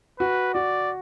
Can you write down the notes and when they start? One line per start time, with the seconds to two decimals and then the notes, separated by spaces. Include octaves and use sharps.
0.19 F#4 B4
0.54 F#4 D5